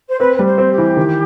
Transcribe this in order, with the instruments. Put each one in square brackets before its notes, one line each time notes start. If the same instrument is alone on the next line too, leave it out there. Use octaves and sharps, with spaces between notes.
[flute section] C5
[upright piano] C4 [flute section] B4
[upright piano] G3 [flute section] B4
[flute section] C5
[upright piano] C4
[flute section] G4
[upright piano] E3
D#3